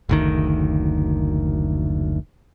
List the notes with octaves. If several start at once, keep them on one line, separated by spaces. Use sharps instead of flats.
F#1 D2 D#3